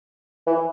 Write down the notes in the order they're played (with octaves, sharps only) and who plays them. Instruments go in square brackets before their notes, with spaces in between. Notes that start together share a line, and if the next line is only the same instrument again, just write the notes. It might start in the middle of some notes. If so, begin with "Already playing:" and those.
[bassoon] E3